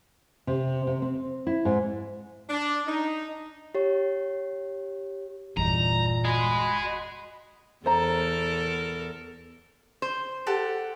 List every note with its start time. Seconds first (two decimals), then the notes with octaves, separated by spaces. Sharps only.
0.47 C3
0.87 C3
1.02 C4
1.47 E4
1.65 G#2
2.50 D4
2.88 D#4
3.75 G4 C#5
5.57 G1 E2 A#2 D#4 A#5
6.25 F#4 D#5 G#5 B5 C6
7.86 E2 A4 A#4 C5 A#5
10.02 C5
10.46 G4 A4 F#5